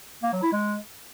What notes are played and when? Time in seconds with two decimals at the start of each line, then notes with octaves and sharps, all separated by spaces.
0.23 A#3
0.33 F#3
0.43 E4
0.52 G#3